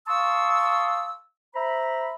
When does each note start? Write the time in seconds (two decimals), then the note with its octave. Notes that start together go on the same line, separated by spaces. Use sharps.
0.07 F5 A5 C6 C#6 D#6 E6
1.55 C5 E5 A#5 B5